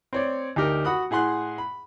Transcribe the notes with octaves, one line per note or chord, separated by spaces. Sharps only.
C4 C#5 D5
D2 D#4 G4 A#4
F#4 F#5 B5 D#6 F#6
A2 G#4 F#5 C6 F#6
B5